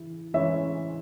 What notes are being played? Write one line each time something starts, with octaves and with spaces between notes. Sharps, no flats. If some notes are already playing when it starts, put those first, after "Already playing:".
Already playing: E3 E4
E3 C#4 E4 E5